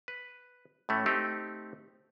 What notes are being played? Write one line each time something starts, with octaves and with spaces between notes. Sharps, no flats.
B4
A2 E3 A3 C#4
A3 C4 D#4 G4